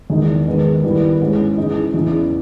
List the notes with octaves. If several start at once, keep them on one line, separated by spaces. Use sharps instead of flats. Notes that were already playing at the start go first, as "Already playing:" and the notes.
E2 D#3 G#3 D#4
G#2 D#3 G#3 B3
D#3 G3 B3 E4
G#2 E3 G#3 C#4
C#3 E3 G#3 D#4
E2 C#3 E3